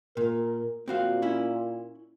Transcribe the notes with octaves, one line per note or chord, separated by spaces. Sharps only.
A#2 A#4
A#2 C4 F#4 F5
C#4 E4